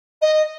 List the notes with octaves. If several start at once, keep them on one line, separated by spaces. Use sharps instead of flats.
D#5